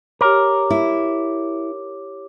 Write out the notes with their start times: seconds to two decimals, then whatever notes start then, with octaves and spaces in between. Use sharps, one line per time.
0.21 G4 A#4 C#5 D6
0.70 E4